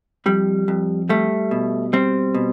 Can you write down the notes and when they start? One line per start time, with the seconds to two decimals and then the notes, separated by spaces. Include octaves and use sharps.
0.26 F2 G3
0.68 F2
1.09 G3 A3
1.51 B2
1.93 G3 C4
2.35 B2